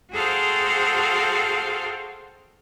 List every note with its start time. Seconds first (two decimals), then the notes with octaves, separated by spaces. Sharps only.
0.13 F#4 G#4 A4 C5 F5 G5